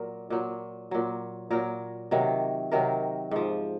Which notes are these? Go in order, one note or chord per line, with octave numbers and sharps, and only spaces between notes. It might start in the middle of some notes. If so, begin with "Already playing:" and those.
Already playing: A#2 F#3 A#4
A#2 F#3
A#2 F#3
A#2 F#3 A#4
C3 D#3 F#3
C3 D#3 F#3 A#4
G#2 F3